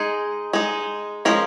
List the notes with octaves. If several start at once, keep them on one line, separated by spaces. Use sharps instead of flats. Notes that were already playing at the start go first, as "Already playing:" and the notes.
Already playing: G#3 D#4 G#4
G#3 D#4
F3 G#3 C#4 A#4